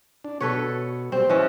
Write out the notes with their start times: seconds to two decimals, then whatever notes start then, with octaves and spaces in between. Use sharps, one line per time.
0.25 D4
0.41 B2 A4 B4 C#5
1.12 G3 C4
1.29 E3 C#4 D#5